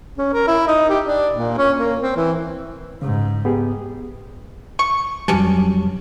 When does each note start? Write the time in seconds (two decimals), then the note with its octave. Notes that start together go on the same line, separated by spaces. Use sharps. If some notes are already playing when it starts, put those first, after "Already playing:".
0.18 C#4
0.33 A#4
0.47 E4
0.67 D#4
0.89 G4
1.06 D4
1.35 A#2
1.58 C#4
1.77 A#3
2.00 C4
2.16 E3
3.02 G#2 C#3
3.45 B3 G4 G#4
4.79 C#6
5.28 F2 F#3 G3 C#4 D4